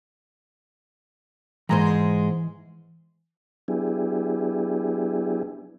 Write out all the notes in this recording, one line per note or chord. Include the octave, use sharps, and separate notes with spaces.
G#2 E3 G#3 C5 A#5
F#3 B3 D4 E4 G4 G#4